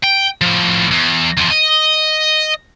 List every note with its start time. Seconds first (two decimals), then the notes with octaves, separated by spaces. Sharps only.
0.04 G5
0.41 A2 F3
0.91 E2
1.37 E2 F3
1.51 D#5